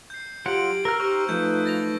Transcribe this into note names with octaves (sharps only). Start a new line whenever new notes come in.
G6 C7
F#3 F4 G4 F#5 D7 F#7
A#4 E6 F6
D#4 G4 C5 C#6 F6
F3 A3 D#4 B4 G6
A6 A#6 F7